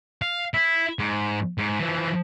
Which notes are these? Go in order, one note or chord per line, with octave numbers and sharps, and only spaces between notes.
F5
E4
G#2
G#2
E3 F3